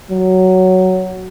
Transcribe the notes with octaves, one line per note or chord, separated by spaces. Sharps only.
F#3